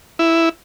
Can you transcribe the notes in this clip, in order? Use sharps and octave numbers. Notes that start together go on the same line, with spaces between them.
E4